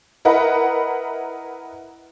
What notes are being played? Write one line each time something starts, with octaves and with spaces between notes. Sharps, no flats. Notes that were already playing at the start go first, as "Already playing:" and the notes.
E4 A#4 B4 D#5 F#5 B5